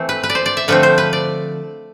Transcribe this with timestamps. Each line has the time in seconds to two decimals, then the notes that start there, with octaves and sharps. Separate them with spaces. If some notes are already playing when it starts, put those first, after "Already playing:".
Already playing: E3 A3 C4
0.09 B4
0.23 B4
0.30 D5
0.35 C5
0.46 D5
0.57 E5
0.68 D3 F3 A3 C4 B4
0.83 C5
0.98 B4
1.13 D5